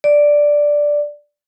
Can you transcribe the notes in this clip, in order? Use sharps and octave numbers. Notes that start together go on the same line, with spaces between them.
D5